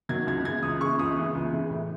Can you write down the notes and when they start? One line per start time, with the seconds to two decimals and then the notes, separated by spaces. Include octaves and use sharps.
0.09 D#3 F#3 G#6
0.27 C#2 G#6
0.45 C#3 E3 G#3 G#6
0.63 C#2 D#6
0.81 C#3 E3 G#3 C#6
0.99 C#2 D#6
1.17 C#3 E3 G#3
1.35 C#2
1.52 C#3 E3 G#3
1.70 A2